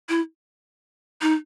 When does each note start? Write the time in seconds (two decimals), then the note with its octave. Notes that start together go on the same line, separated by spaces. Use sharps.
0.09 E4
1.22 D#4